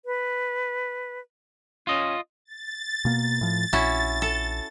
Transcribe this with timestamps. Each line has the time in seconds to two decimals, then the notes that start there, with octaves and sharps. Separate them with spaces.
0.05 B4
1.87 C#4 F4 D#5
2.45 A6
3.05 B2 A#3
3.41 A2 F3
3.73 A#1 C#4 E4 F#4
4.22 A4